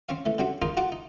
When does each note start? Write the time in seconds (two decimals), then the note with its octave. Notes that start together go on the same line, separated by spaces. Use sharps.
0.09 C4 C#4 C#5 F5
0.25 E3 A3
0.38 D3 G3 C4 C#4 F#4
0.62 D4 D#4 F4 G#4 A#4 C5
0.77 F4 F#4 F#5 A5 D6
0.92 D#4